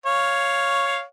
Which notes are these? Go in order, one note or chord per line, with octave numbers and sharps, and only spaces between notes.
C#5 F5